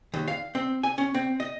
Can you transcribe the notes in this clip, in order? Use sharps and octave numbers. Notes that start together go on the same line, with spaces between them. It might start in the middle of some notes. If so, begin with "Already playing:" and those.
D#2
F5
C4
G#5
C#4
C4
D#5